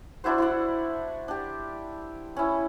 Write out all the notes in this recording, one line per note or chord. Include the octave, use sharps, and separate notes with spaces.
D4 E4 F#4 C5
E4 D5 F#5
D4 G4
C#4 E4